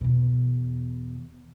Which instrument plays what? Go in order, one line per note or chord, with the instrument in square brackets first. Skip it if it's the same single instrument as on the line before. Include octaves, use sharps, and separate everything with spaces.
[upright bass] E2 B2